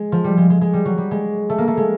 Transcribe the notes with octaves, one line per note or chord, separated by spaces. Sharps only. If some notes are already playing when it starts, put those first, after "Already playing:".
Already playing: G#3
F3
G3
G#3
G#3
G#3
G3
F#3
G3
G#3
A3
A#3
A3
G#3